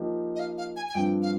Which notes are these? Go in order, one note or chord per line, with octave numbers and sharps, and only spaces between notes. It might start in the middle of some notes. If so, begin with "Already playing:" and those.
Already playing: F3 A#3 D#4 G4
D#5
F5
F5
G#5
G#5
G2 F3 C4 G5
F5